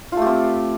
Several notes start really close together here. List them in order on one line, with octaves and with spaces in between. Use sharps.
F4 A3 G4 C4